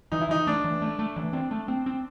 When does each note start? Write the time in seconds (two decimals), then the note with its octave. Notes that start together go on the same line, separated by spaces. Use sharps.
0.12 E3 D#4
0.22 E4
0.29 E3 D#4
0.47 A3 D4
0.64 E3
0.82 A3
0.99 A3
1.16 E3
1.33 C4
1.51 A3
1.68 C4
1.86 C4